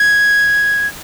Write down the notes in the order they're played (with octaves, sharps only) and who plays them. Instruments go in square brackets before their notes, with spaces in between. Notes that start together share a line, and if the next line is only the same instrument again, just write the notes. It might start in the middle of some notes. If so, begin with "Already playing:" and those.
Already playing: [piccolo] G#6